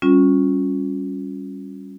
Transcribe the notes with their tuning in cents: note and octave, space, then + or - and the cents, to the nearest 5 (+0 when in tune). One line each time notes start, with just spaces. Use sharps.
G3 +0 C#4 +0 F4 +30